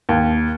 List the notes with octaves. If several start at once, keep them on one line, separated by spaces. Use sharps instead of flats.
D#2